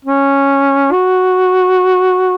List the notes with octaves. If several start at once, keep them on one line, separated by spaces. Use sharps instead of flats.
C#4
F#4